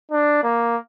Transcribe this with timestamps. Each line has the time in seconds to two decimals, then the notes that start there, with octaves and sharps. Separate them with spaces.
0.11 D4
0.43 A#3